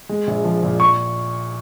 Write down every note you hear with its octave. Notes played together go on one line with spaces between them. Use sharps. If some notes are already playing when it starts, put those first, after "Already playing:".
G#3
A#1
F3
A#2
C#6